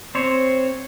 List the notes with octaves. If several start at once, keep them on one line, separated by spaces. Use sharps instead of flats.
C4 C5 C#5